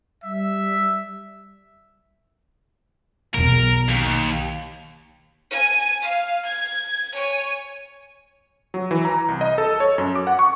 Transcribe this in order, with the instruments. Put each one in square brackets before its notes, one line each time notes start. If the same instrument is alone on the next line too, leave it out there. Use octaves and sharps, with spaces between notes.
[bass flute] G3 [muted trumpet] E5
[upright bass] B1 E2 [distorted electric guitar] A#4
[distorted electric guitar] D#2
[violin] G#5
F5
G#6
C#5 G#5
[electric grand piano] F#3
E3
A#5
C2
D#5
A4
C#5
F#2
D6
F#5
C#6